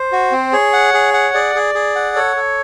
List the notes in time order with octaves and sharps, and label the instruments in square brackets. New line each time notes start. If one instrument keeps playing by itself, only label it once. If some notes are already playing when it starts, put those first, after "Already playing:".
Already playing: [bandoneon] C5
[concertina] F#4
C4
[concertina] G#4 [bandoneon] C#5
[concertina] F#5
G#4
F#5
[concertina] G#4 [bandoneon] D5
[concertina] G#4
G#4
F#5
[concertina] A4 [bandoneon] C#5
[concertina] A4